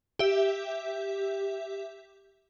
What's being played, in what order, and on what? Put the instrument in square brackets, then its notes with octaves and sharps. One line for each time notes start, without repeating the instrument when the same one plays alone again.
[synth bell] G4 E5